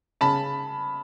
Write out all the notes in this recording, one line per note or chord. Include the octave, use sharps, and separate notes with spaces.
C#3 A5 B5